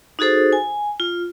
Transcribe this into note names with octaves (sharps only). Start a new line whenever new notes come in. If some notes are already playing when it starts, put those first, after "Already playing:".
D#4 F#4 G#4 A4 C5
G#5
F4